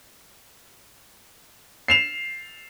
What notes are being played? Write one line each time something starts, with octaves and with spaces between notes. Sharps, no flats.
C7 E7 F7